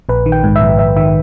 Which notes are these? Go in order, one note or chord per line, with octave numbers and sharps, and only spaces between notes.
A#1 B4
D#3
G5
G#2
E5
A#1
A#1 E5
D#3 E5